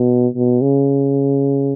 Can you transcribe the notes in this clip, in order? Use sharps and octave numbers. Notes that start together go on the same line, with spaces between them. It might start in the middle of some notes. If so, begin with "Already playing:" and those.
Already playing: B2
B2
C#3